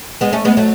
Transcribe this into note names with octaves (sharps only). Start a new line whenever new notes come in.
G#3 B3
A3 C#4
G#3 B3
F#3 A3